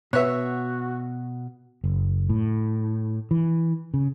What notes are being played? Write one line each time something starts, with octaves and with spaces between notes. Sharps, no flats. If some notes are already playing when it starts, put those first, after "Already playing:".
B2 F#4 B4 C#5 E5 F#6
F#1
A2
E3
C#3